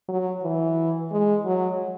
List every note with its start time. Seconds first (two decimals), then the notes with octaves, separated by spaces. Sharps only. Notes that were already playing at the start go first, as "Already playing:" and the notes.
0.09 F#3
0.43 E3
1.12 G#3
1.45 F#3